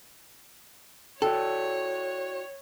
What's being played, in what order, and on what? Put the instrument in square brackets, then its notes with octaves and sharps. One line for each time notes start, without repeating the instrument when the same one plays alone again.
[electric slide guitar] E4 F#4 D5 [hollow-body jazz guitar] A4 [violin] C#5 [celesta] G5